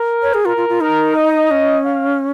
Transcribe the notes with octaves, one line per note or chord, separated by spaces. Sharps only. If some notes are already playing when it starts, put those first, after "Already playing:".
Already playing: A#4
C#5
G#4
F4 A#4
F4
F4
D#4 A#4
D#5
C#4
F5